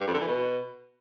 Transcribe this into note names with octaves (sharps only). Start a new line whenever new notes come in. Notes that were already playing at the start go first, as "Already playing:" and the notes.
G2
F2
D3
E3
B2